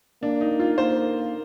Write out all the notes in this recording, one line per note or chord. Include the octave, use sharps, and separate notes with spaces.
A#3 D4
D#4
F4
A#3 C5